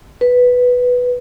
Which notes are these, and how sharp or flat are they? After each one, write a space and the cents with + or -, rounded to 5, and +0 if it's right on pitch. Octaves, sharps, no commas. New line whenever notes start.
B4 +0